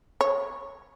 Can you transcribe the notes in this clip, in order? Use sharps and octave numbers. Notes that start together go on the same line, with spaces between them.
C#5